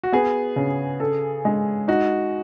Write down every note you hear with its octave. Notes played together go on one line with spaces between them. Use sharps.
F#4
B3 G#4
C#3
A4
G#3
D#4 F#4